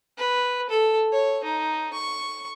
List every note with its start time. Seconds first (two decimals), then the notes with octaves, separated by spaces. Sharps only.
0.18 B4
0.70 A4
1.12 C#5
1.44 D#4
1.94 C#6